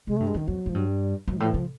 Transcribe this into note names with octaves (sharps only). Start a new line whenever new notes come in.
C3 G#3
A3
G2
G#3
F#2 D#3
F2 F#3
G#2 F3
G2 F#3
G3
G#2 F#3
D#3
A2 F3
E3
C#3 F3